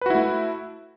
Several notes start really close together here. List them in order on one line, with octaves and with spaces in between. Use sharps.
B4 F#4 E4 A3